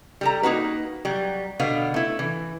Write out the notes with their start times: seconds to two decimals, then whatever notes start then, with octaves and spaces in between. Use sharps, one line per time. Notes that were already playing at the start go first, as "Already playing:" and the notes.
0.21 G3 A4 A#5
0.43 A#3 D#4 F#4 B4
1.05 F#3 G3
1.60 B2 D3 B3 F5
1.94 A3 E4
2.19 E3